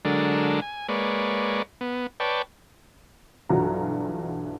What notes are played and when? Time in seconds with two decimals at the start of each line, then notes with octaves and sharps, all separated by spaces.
0.05 D3 F#3 G#3 D4 A4 A#4
0.62 G#5
0.89 G#3 A#3 B4 C#5 D5
1.81 B3
2.20 B4 C#5 D5 G5 A5
3.49 B1 G2 E3 F#3 F4 A#5